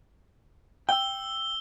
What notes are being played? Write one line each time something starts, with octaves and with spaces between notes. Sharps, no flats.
G5 E6 G7